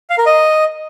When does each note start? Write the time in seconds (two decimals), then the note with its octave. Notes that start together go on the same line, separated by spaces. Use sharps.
0.10 F5
0.18 A#4
0.26 D#5